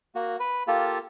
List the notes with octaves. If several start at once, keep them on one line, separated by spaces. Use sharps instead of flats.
A#3 F#4
B4
A#3 F4 G4 A4